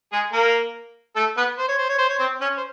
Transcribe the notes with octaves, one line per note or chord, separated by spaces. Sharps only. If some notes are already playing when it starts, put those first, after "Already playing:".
G#3 G#4
A#3 A#4
A3 A4
B3 B4
C5
C#5
C5
C#5
C5
C#5
C4 C5
C#4 C#5
C5